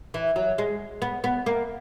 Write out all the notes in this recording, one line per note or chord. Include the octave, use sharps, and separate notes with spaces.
E3
F#3
G#3
B3
B3
A#3